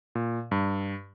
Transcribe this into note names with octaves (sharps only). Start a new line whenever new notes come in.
A#2
G2